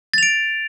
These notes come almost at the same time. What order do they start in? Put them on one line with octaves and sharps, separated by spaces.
A6 F7 D7